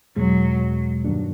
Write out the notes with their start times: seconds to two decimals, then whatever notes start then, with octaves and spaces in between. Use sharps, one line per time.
0.16 E2 B2 F#3 G#3
1.04 G2 D#3 F#3 A#3 D4